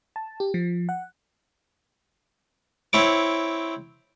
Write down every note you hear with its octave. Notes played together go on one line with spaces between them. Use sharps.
A5
G4
F3
F#5
C4 E4 C#5 D6